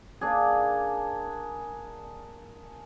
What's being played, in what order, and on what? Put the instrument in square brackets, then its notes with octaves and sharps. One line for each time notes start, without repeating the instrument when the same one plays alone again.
[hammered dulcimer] A#3 D4 G#4